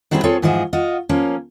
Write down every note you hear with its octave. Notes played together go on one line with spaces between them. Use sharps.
F#3 G3 C4 E4 G4 G#4
C4 F4 G#4 A4 C#5
G#2 E3 F3 E4 F#4 G#4
F4 F#4 D#5
F3 A#3 C#4